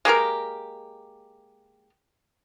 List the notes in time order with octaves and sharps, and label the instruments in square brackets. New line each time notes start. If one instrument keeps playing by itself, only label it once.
[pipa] G#3 A#3 G4 A#4